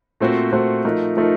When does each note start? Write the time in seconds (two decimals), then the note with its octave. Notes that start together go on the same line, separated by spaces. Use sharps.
0.20 A#2 A3 C4 F#4 C5
0.52 A#2 A3 C4 F#4 C5
0.85 F3 A3 D#4 A#4
1.17 F3 A3 D#4 A#4